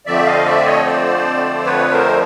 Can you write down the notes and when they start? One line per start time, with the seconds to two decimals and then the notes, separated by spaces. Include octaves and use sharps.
0.06 F2 D3 F3 A3 C4 D5 E5
0.26 D#5 F5
0.46 D5 E5
0.66 C#5 D#5
0.86 C5 D5
1.65 B4 C#5
1.92 A#4 C5